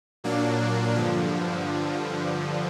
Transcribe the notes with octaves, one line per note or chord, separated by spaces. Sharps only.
A#2 F#3 A#3 D4
G2 D3 F3